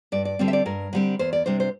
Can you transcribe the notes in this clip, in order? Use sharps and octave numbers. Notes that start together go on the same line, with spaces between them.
G2 D5
D5
D3 G3 C4
E5
D5
G2 A#4
D3 G3 C4
E2 C5
D5
C3 G3 D4 C5
C5